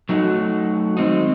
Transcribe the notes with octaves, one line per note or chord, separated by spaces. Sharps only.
F#3 A3 D#4 F#4
D#3 G#3 C4 D#4